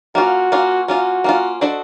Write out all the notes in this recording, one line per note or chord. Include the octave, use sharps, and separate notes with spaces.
A#3 C#4 F4 F#4
A#3 C#4 F4
A#3 C#4 F4 F#4
A#3 C#4 F4
D4 F#4 A4 C5 D#5